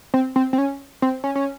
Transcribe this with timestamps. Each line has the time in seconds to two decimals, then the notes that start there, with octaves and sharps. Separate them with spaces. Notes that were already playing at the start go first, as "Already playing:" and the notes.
0.14 C4
0.36 C4
0.53 C4
0.58 C#4
1.02 C4
1.24 C#4
1.35 C#4